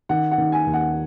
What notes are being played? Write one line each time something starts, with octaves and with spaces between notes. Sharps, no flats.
D#3 F#5
F#5
D#3
G#5
D#2
F#5